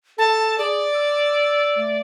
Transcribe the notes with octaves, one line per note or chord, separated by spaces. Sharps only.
A4 A5
G#4 D5
E6
A3